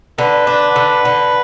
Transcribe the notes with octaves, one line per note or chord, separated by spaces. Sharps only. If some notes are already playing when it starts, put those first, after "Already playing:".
D3 B4
D4
D3
D3